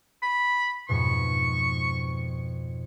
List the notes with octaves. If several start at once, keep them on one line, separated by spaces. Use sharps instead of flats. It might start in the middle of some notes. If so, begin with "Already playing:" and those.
B5
F2 G#2 B2 C#6